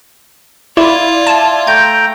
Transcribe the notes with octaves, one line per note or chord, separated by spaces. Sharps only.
E4 F4 D5 E5 G#6
A5
A3 G5 A#5 G6